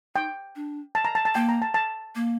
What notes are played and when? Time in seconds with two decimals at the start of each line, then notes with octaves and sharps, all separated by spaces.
0.15 D#4 G5
0.56 D4
0.95 A5
1.05 A#5
1.15 A5
1.25 A5
1.35 A#3 G5
1.49 A#5
1.62 A5
1.74 A5
2.15 A#3